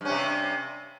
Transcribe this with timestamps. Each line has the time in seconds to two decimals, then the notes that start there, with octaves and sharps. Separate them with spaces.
0.01 G2
0.05 C#4
0.09 C3